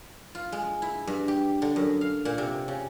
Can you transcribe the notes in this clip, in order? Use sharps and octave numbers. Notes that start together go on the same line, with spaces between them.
F4
G#3
E4
G2
G4
D3
F#2
F5
A#2
C3
C#3